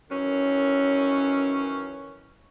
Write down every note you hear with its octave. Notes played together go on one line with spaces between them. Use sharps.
F#2 D#3 E3 C#4